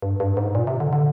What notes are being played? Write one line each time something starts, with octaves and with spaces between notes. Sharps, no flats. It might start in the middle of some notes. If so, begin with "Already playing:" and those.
G2
G2
G#2
A#2
C3
D3
D3